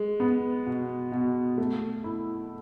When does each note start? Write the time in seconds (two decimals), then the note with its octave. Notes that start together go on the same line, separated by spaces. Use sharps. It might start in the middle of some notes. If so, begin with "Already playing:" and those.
Already playing: G#3
0.20 B3
0.66 B2
1.12 B2
1.58 A3
2.04 E4